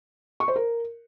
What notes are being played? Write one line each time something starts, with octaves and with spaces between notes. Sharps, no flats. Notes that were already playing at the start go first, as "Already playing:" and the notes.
C#6
C5
A#4